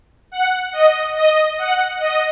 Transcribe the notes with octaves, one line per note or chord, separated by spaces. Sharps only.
F#5
D#5
D#5
F#5
D#5